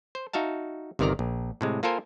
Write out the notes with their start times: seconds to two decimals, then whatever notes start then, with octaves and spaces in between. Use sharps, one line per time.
0.15 C5
0.33 D#4 F#4 E5 F5 A5
0.99 G1 C3 D#3 A#4 D5 A#5
1.19 A#1
1.61 A2 C3 G#3
1.83 A#3 F4 A4 A#4 C5 G#5